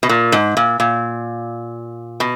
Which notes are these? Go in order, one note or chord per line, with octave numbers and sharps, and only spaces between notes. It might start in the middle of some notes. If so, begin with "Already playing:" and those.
B2
A#2
G#2
A#2
A#2
B2